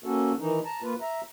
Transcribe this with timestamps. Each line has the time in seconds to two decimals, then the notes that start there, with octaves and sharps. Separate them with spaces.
0.04 A#3 C#4 F#4 A4
0.39 D#3 E3 D#4
0.64 A5 A#5
0.82 A#3 F4 B4
1.01 E5 A#5